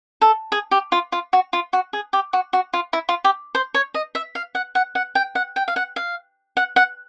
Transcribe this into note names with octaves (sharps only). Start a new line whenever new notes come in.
A4
G#4
G4
F4
F4
F#4
F4
F#4
G#4
G4
F#4
F#4
F4
E4
F4
G4
C5
C#5
D#5
E5
F5
F#5
F#5
F#5
G5
F#5
G5
F5
F#5
F5
F#5
F#5